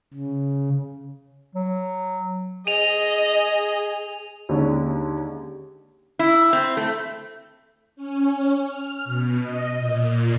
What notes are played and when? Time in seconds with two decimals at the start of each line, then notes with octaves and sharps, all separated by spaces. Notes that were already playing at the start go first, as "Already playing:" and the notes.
0.14 C#3
1.55 F#3
2.67 G#4 D#5 D#7 F7
4.49 D#2 D3 G#3 C#4
6.19 E4
6.53 C4
6.77 A3
7.96 C#4
8.66 F6
9.04 B2
9.42 D#5
9.78 A#2